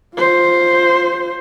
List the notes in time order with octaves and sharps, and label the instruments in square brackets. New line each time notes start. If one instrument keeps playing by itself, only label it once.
[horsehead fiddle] F4 C5